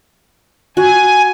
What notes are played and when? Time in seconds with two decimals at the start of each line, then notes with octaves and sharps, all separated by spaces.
0.77 F#4 G#5